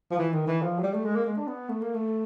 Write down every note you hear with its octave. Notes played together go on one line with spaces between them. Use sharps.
F3
E3
D#3
E3
F3
F#3
G3
A3
G#3
A#3
G#3
D4
B3
A3
A#3
A3